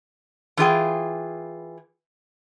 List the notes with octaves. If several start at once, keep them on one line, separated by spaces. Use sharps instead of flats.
E3 F4 G#4 G5